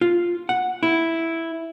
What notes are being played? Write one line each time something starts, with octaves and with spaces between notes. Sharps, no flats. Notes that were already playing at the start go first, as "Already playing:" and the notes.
F4
F#5
E4